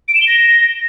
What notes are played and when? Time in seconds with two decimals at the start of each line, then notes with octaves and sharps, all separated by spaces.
0.08 D7
0.15 E7
0.21 G7
0.28 A#6